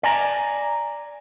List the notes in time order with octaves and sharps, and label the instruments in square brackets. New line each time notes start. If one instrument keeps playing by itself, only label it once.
[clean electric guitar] D5 G#5 A#5